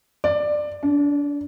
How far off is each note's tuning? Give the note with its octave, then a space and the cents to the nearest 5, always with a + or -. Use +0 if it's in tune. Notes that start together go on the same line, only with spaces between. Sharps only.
D5 +15
D4 -30